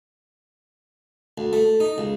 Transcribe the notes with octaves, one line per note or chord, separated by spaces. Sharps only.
D2
A3
D#4
C#2